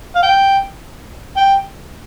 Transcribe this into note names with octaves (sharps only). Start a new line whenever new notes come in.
F5
G5
G5